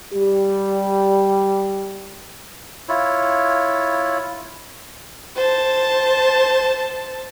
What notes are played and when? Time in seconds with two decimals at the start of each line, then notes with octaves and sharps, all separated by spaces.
0.13 G3 G4
2.89 E4 F4 C#5
5.36 C5 A5